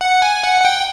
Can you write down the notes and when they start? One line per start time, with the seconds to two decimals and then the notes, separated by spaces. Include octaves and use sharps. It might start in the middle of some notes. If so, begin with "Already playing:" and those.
0.01 F#5
0.22 G#5
0.43 F#5
0.61 F#5
0.65 G5